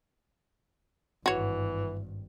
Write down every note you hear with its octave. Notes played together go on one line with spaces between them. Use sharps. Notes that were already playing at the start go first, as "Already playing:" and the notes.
G#1 G2 E3 F#4 C#5